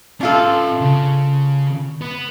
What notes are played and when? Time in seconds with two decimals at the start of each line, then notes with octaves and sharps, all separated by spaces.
0.21 C#4 D4 F4 A4 E5
0.80 C#3
2.01 B3